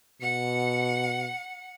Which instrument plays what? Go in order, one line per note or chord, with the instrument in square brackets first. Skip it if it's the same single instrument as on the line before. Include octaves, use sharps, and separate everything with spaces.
[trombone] B2 [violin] F#5 C#7